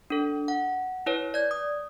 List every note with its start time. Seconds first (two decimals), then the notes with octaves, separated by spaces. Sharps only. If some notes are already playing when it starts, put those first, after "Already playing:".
0.10 D4 A4
0.48 F#5
1.06 E4 B4 C#5
1.34 D5 G#6
1.51 D#6